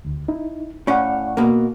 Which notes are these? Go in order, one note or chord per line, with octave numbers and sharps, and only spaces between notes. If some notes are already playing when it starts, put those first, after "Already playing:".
D2
D#4 E4
A2 C#4 D5 F5 F#5
B2 A#3